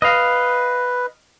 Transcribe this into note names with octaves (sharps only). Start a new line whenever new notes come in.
B4 D#5 F5